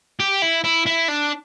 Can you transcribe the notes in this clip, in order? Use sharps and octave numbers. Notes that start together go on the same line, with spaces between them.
G4
E4
E4
E4
D4